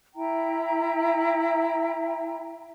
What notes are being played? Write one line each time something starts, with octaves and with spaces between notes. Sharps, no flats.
E4 E5 G5 A#5